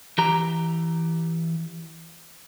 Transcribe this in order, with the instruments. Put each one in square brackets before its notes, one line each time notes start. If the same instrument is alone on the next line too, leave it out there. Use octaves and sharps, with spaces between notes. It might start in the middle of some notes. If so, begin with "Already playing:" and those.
[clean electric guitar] E3 G4 A#5